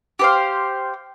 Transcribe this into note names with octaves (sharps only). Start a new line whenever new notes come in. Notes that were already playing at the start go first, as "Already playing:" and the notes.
G4 C5 F5